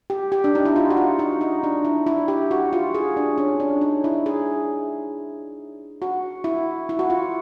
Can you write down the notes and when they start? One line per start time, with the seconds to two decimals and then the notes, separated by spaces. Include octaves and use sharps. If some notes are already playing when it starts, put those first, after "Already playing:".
0.10 G4
0.32 G4
0.44 D4
0.55 D#4
0.65 E4
0.76 F4
0.90 F#4
0.97 F4
1.19 D#4
1.41 D#4
1.64 D4
1.85 E4
2.07 E4
2.28 G4
2.51 F#4
2.73 F4
2.95 G#4
3.17 D4
3.38 C#4
3.60 D4
3.81 D#4
4.04 E4
4.26 G#4
6.02 F#4
6.44 E4
6.89 E4
6.99 F#4
7.10 F4